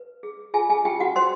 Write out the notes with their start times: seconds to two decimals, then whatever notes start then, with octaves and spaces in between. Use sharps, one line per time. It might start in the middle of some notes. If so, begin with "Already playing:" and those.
Already playing: B4
0.23 G#4
0.54 F4 G#4 G#5
0.70 G#4 G#5
0.85 F4 G4 G5
1.00 F#4 F#5
1.16 A#4 C5 C6